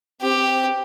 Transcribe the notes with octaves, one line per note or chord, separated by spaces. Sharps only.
C4 G4